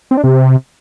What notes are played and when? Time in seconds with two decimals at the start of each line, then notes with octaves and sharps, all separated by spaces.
0.11 C4
0.17 D4
0.24 C3